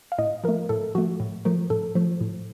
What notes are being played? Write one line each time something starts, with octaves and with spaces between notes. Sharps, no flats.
F5
A2 D#5
F3 A3 A#4
A2 A4
F3 A3 F#4
A2
F3 A3 A#4
A2 A4
F3 A3
A2